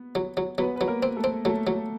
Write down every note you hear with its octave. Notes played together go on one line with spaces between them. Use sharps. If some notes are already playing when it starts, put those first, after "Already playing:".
Already playing: B3
F#3
F#3
F#3 B3 B4
B4
F#3
A#3 A#4
C4
A3 A4
C4
F#3 A3 A4
F#3